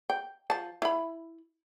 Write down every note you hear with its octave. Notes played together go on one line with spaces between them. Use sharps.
G5
F3 A5
E4 B5